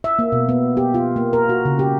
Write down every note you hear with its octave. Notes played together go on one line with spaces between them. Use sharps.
E5
A#3
B2
B3
G4
F4
A#3
A#4
F#4
C#3
G4